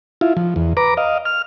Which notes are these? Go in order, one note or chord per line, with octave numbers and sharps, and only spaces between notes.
E4 F4
F3
E2
B4 A#5 D6
D#5 F5
F6